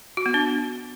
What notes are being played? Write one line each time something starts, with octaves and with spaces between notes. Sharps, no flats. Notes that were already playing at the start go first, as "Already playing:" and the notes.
F#4
B3
D4